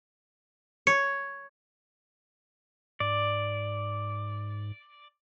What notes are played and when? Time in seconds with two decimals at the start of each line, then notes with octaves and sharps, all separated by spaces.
0.87 C#5 C#7
3.00 G#2 D5